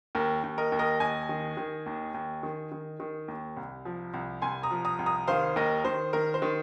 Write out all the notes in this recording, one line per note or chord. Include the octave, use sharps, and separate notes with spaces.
D#2 A#4
D#2
A#4 D#5
D#2
A#4 D#5
D#2 D#5 G#5
D#3
D#3
D#2
D#2
D#3
D#3
D#3
D#2
C2
F3
C2
C2 G#5 C6
A#5 D#6
F3
A#5 D#6
C2
A#5 D#6
D#3 C5 F5
D#2 A#4 D#5
D#3 C5
D#3 A#4
C5
D#3